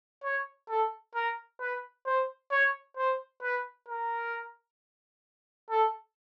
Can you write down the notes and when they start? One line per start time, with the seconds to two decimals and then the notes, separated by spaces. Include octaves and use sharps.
0.24 C#5
0.69 A4
1.15 A#4
1.61 B4
2.06 C5
2.51 C#5
2.97 C5
3.42 B4
3.89 A#4
5.70 A4